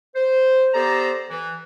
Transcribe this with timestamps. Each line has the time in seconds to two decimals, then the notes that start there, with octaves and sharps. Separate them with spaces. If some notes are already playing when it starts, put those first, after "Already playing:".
0.15 C5
0.74 B3 G4 A4 C5 D5 A#5
1.30 E3